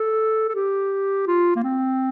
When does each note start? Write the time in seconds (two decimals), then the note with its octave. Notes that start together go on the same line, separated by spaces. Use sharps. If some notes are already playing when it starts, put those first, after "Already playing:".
Already playing: A4
0.49 A4
0.55 G4
1.27 F4
1.56 A#3
1.64 C4